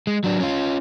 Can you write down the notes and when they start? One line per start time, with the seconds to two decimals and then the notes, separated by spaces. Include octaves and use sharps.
0.07 G#3
0.24 F#3 D4
0.40 C#4 F4